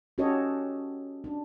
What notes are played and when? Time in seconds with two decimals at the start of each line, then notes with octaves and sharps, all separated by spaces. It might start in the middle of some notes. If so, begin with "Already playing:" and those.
0.18 C#4 F#4 G4 A4 C#5 D#5
1.24 D4